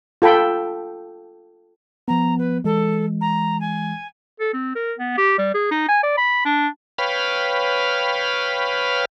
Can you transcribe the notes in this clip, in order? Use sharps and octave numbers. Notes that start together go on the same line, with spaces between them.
F4 A4 G5 B5
F3 B3 A#5
B4
E3 G#3 A4
A#5
G#5
A4
C4
A#4
B3
G4
G3
G#4
D#4
G#5
D5
B5
D4
B4 C#5 F5 G5 B5 F6